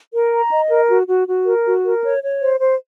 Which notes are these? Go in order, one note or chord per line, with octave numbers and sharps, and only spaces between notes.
A#4
A#5
D#5
A#4
F#4
F#4
F#4
A#4
F#4
A#4
C#5
C#5
C5
C5